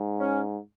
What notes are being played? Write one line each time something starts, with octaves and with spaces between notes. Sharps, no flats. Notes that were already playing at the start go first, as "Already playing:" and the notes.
Already playing: G#2
C#4